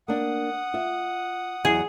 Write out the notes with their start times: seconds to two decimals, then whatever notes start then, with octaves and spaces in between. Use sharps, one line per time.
0.08 A#3 D4 F#5 D#6
0.74 F4 E5
1.65 E2 F#3 G#4